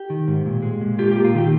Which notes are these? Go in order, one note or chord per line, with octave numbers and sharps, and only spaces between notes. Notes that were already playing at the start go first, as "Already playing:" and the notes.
Already playing: G4
D#3
G#2
A#2
G#3
A#2
F4 G4
G4
A#3
F4
D#3 G4